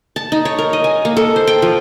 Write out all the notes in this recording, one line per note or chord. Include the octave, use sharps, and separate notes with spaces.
A5
D#4
C#5
A#4
D#5
G#5
A#3
A4
C5
G5
F3